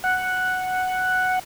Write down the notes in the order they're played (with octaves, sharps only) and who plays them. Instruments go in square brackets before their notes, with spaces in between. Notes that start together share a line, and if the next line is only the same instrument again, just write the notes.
[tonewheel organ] F#5